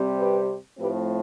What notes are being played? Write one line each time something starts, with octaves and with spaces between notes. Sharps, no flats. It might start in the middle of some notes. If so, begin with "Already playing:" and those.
Already playing: C3 G3 C4
G4 B4
A2 F3 A3 C4 G4 B4